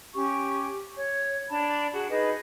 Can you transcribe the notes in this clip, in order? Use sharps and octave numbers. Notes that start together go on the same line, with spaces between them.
C#4 G4 C#6
C#5
D4 A5 B5
F#4 G#4
D#4 G#4 B4 D#5